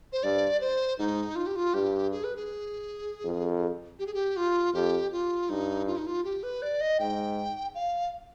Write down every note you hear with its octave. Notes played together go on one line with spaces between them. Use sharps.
C5
G2 D5
C5
G#2 D#4
F4
G4
F4
G2 G4
G#4
B4
G#4
F2
G4
G#4
G4
F4
F2 G4
F4
G2 D#4
F4
D#4
F4
G4
B4
D5
D#5
G#2 G5
F5